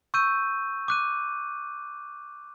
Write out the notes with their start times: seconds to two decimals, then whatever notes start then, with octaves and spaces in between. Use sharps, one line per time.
0.14 C#6 E6 G6 D#7
0.88 D6 F#6 D#7